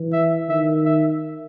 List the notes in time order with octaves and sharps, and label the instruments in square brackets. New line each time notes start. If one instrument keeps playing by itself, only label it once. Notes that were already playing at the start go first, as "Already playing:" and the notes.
Already playing: [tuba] E3
[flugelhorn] E5
[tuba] D#3 [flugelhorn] E5
[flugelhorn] E5